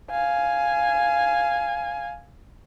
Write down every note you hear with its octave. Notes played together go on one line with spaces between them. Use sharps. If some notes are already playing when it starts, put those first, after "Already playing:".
F5 G#5